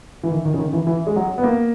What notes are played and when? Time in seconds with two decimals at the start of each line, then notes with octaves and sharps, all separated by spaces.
0.23 E3
0.31 D#3
0.45 D#3
0.54 C#3
0.59 D#3
0.73 E3
0.87 E3
1.07 G#3
1.16 F#3
1.38 B3
1.43 A#3